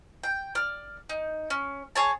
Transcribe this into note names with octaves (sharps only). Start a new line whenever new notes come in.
G5
D5 F6
D#4
C#4
G#4 C#5 A5